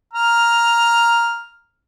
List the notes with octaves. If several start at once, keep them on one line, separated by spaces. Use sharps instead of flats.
A#5 F6